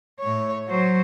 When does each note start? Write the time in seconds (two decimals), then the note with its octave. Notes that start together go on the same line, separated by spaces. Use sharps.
0.20 A2 C#5
0.68 F#3 C5